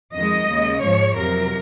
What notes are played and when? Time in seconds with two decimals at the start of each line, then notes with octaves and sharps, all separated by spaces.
0.14 F2 D#3 G#3 D#5
0.48 D#2 C#3 G#3
0.82 G#2 F3 G#3 C#5
1.17 F2 C3 F#3 A#4